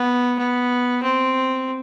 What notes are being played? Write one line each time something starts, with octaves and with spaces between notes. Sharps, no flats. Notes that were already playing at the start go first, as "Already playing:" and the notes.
Already playing: B3
B3
C4